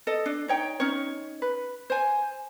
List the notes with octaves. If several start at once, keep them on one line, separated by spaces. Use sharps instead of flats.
A4 D#5
D4
D#4 C#5 G5
C#4 D#4 C#5
B4
C5 G#5